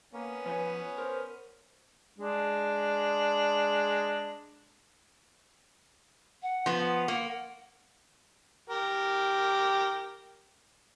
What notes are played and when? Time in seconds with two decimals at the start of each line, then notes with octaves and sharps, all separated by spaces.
0.14 A#3 B3 C#4
0.46 F3 B4 C#5 G#5
0.98 A#4 C5
2.18 G#3 D4
6.43 F#5
6.66 F3 B3
6.79 F#5
7.08 A#3
8.70 G4 A#4